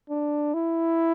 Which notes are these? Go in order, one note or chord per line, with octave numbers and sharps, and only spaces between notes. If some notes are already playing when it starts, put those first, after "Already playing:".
D4
E4